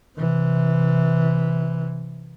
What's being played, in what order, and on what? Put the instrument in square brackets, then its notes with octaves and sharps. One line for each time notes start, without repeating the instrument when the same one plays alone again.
[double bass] C3 E3